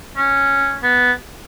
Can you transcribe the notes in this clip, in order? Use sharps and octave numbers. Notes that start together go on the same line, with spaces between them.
C#4
B3